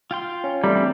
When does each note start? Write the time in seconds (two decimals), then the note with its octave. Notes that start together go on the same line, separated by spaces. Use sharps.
0.11 F4 G5 C6
0.44 C#4
0.64 E3 G3 A3 C4 D4 A#5